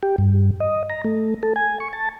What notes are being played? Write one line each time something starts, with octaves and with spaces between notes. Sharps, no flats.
G4
G2
D#5
A#5
A3
A4
G#5
C#6
A5